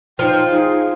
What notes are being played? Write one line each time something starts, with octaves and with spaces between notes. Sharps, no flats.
F3 D#4 F4 G5
D#4 F4 G#4